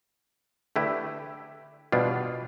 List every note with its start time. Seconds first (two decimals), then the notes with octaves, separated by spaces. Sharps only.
0.76 D3 A3 E4 G4 B4
1.92 B2 G3 D4 F4